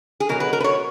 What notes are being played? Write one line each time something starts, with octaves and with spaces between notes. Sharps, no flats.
G#4
B2 F#3 A#4
B4
A#4
B4
C#5